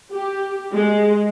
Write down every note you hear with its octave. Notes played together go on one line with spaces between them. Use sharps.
G4
G#3